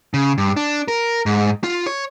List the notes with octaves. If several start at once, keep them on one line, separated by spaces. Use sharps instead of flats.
C#3
G2
D4
A#4
G#2
F4
C#5